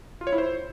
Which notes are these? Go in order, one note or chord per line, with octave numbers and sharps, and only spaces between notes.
F4
C#5
E4
C5